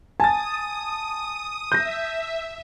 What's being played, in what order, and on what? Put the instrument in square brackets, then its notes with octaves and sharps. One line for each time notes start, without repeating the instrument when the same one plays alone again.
[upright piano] G#5 [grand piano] A5 A6 [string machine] D#6
[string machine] E5 [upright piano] G6 A#6